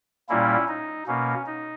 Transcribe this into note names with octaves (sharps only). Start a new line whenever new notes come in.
A#2 G3 A#3 C#4 E4
D#4
B2 A#3 C#4
D#4